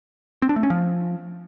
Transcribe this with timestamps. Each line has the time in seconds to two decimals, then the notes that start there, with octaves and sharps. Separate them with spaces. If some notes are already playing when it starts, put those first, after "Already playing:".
0.42 C4
0.49 D4
0.56 A3
0.63 C#4
0.70 F3